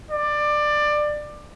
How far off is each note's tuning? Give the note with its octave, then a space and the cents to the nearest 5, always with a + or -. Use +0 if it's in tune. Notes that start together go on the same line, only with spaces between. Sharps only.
D5 +20